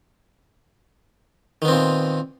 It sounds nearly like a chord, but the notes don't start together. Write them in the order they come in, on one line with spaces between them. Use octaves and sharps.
D#3 B3 C4 A#2